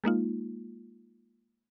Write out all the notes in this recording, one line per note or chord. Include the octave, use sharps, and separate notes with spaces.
G#3 A#3 D#4 F4